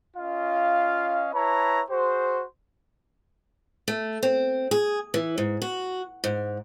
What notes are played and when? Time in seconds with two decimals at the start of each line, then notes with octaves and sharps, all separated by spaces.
0.17 C#4 F4 D#5 F5
1.34 E4 B4 C#5 A5 A#5
1.90 F#4 G#4 C5
3.88 A3
4.23 C4
4.71 G#4
5.14 E3
5.38 G#2
5.62 F#4
6.24 G#2